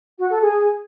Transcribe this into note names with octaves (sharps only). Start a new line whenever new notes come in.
F#4
A4
G#4